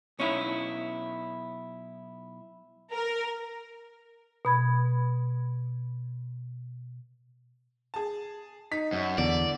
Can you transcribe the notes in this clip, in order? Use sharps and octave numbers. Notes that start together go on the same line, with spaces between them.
B1 C#4 D#4 E4
A#4
B2 B5 G#6
G#4 A5
D#4 B6
F#2
E2 D3 D5